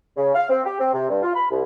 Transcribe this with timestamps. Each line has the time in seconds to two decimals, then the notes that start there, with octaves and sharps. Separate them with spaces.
0.17 C#3
0.34 F5
0.49 C4
0.65 G4
0.80 C4
0.93 C3
1.09 G2
1.22 F4
1.34 B5
1.50 C2